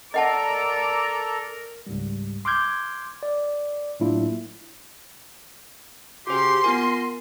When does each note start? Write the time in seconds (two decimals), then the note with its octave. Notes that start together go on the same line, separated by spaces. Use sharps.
0.14 A4 A#4 D5 D#5 F#5 A5 A#5
1.87 C#2 G#2 G3
2.45 C6 D6 F6 G6 G#6
3.23 D5
4.00 A2 F#3 A#3 D4 E4 F4
6.27 C#3 C#4 F#4 G4 C5 C6
6.64 B3 F4 A#4 G#5